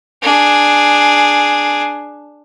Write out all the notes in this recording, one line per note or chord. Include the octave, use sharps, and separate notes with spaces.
D4 G#4